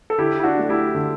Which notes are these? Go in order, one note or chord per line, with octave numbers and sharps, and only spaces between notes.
A4
D3 E4 G4
E4
D4 F#4
F#3 A3
E4 G4
D3